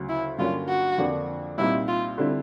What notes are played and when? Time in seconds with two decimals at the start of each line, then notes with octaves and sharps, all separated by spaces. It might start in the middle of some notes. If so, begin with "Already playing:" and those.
Already playing: D2 C#3 F#3
0.09 E4
0.38 G2 D3 F#3 A#3 C#4 F4
0.69 F#4
0.98 F2 D3 F3 A#3 D4
1.58 C2 A#2 G3 C4 D#4 E4
1.88 F4
2.18 D3 G3 C4 E4